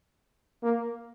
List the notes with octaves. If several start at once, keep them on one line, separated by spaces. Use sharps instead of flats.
A#3